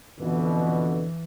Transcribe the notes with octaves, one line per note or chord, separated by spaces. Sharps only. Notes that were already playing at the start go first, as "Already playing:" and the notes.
F2 B2 D3 E3